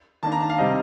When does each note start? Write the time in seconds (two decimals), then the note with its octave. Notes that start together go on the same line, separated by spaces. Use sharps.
0.23 D#3 A#3 D4 A5
0.32 A#5
0.40 A5
0.50 F5
0.58 C3 G3 C4 D#5